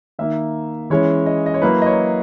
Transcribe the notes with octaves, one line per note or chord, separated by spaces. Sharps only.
D#3 A#3 D#4 E5
E3 G#3 C#4 E4 C#5
D#5
D#5
C#5
F#3 A#3 E4 B4
D#5
C#5